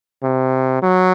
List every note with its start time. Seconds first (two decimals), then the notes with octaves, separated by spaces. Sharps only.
0.23 C3
0.82 F#3